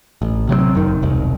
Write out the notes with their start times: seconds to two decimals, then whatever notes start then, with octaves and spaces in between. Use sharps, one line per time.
0.22 A1
0.49 C3 F#3 G3 C4
0.75 F#1 F#2 D#3
1.02 E1 C2